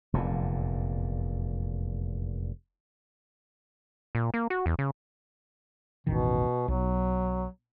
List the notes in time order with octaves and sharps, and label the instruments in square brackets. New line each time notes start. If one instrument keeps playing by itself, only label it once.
[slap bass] F1 E2 A#2
[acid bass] A#2
A#3
F#4
E2
C#3
[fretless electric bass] E1 A1 D#3 [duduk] B2
[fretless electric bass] B1 [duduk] F#3